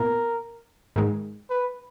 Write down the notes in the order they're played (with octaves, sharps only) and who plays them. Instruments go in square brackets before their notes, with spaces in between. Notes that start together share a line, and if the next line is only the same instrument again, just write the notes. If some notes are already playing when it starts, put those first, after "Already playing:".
Already playing: [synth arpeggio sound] A#2 B3 E4 [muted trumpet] A#4
[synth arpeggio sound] G#2 D#3 G#3
[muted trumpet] B4